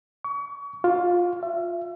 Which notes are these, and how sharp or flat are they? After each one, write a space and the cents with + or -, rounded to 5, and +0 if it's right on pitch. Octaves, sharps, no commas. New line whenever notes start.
C#6 +35
F4 +20
E5 +40